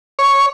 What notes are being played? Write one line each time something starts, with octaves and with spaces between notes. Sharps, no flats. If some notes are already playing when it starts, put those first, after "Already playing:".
C#5